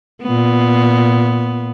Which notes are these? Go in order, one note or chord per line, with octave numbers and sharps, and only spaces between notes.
A#2 B3